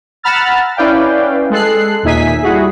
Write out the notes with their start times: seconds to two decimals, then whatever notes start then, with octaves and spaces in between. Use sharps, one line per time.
0.23 F#5 A#5 B5 E6 F6 A6
0.76 C#4 E4 B4 D5 F5 G5
1.50 G#3 A4 F#6 C7
2.03 D#2 A#2 D#4 E5 G#5 B6
2.42 G3 E4 F#4 G#4